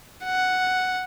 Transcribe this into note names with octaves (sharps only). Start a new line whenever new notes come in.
F#5